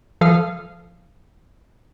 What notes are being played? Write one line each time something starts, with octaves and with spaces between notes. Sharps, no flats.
F3 A4 F5 D#6 F6